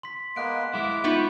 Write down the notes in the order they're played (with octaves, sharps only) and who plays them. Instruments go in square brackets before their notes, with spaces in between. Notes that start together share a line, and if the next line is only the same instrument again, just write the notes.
[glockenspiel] C6 B6
[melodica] G#3 A#3 B3 [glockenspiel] F#6 D7
[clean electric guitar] G#3 E4 [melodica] D6
[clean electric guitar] B3 B4 [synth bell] D#4 F4 E5 [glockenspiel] C#6